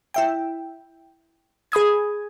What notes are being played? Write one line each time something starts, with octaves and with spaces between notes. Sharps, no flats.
E4 E5 G5
G#4 B5 D#6 G#6